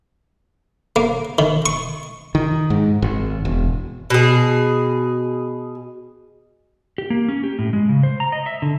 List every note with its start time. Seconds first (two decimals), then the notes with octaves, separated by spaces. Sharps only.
0.96 A#3
1.39 D#3
1.66 C#6
2.35 D#3
2.70 G#2
3.02 G#1
3.45 E1
4.10 B2 G#4
6.98 G4
7.10 A#3
7.28 C#4
7.43 G4
7.59 A2
7.73 G#3
7.89 C#3
8.03 C5
8.20 A#5
8.32 D#5
8.46 E5
8.62 D3